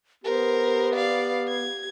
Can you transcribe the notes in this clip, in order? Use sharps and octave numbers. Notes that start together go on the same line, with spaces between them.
B3 G4 A#4 C5
D5 F5
G#6